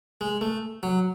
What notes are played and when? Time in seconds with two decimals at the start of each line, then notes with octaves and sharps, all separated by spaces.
0.21 G#3
0.41 A3
0.83 F#3